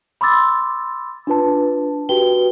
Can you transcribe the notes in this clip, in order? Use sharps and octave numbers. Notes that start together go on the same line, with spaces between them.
B5 C6 D6 E6 A6
D4 F4 B4 A5
F#4 G4 B4 G5 G7